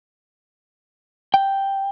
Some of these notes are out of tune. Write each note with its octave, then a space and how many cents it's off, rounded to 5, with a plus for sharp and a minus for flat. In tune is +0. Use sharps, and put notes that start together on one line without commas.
G5 +0